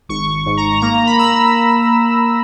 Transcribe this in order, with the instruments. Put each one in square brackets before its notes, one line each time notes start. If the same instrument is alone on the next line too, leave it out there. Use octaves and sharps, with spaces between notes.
[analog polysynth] G#1 C#6
G#2
A#5
A#3 A#5
B5
E6